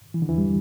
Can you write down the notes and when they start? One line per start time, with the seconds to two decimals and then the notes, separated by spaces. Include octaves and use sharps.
0.14 E3
0.22 D3
0.29 E2 E3
0.38 G3